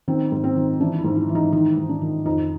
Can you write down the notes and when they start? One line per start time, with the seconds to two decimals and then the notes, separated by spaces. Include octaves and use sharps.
0.08 D#3 C4
0.32 G#2
0.44 C4
0.56 D#3
0.80 E3 D4
0.98 E4
1.04 G#2
1.17 E4
1.29 E3
1.35 D#4
1.52 D#3 D#4
1.77 G#2
1.89 D4
2.02 D#3
2.26 F2 D#4